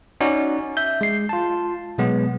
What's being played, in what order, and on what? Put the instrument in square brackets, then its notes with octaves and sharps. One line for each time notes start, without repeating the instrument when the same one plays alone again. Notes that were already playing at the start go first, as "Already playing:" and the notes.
[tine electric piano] C#4 D#4 F#4 D5
E5 G6
G#3 C7
F4 A5
B2 F#3 G#3 B3